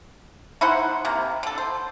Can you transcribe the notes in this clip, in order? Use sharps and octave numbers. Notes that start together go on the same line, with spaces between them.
D#4 E4 C5 F#5
C3 A#3
D3 A4
C5